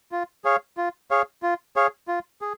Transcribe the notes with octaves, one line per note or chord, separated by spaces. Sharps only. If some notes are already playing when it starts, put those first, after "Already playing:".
F4
G#4 C#5 F5
F4
G#4 C#5 F5
F4
G#4 C#5 F5
F4
G#4